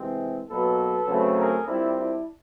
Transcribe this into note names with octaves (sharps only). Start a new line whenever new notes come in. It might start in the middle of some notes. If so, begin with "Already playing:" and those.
Already playing: C3 E3 G#3 C4
B2 F#3 A#3 A4 B4
C#3 F#3 A3 C4
G#4 A#4
A#2 G3 C4 D4 E4
D4 E4